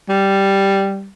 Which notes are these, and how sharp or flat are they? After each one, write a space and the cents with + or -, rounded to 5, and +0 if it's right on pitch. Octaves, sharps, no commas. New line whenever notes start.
G3 +0